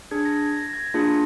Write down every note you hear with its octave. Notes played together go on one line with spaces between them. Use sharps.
D4 G#4 G#6
A#6
G#6
A#6
A#6
G#6
A#3 D4 F4 G#4 A#6